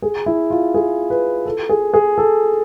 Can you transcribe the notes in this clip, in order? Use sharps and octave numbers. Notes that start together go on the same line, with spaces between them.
G#4
E4
F4
G#4
B4
A4
G#4
G#4
A4